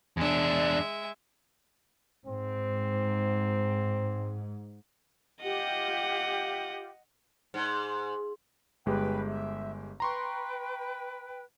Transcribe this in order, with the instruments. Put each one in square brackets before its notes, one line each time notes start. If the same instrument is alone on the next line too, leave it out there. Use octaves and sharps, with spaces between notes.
[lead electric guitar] E2 D4 [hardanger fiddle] G#3 E5
[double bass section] G#2 [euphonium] C4
[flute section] F4 G4 [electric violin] D#5 F#5
[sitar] G#2
[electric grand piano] G1 G#3 G4 [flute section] B4 G5
[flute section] E5
[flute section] B4 G5 [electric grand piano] A#5 C6 C#6